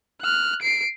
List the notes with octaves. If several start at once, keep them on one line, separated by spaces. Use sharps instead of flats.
F6 F#6
C7 D7